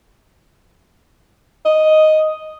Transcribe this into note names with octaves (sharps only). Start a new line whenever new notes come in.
D#5